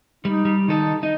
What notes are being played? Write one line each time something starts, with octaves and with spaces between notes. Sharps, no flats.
G3 D#4
G3
D#3 D#4 A4
D#4